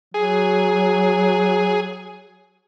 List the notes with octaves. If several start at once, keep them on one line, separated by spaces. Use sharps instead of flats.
F#3 G#4